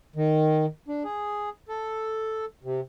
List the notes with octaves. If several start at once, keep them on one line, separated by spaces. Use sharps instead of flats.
D#3
D4
G#4
A4
C3